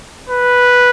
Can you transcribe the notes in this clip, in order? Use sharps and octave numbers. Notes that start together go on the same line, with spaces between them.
B4